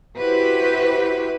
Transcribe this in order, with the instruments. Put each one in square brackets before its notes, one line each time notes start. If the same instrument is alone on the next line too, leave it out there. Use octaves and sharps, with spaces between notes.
[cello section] E4 F#4 G4 B4 C5